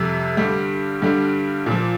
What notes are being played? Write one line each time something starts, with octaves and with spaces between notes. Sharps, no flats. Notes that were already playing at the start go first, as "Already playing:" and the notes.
Already playing: F2 C3 G3
G2 D3 G3
G2 D3 G3
A#2 F3